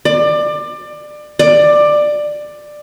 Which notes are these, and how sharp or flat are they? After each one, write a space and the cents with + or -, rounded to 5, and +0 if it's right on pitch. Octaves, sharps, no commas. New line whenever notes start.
D5 +25
D5 +15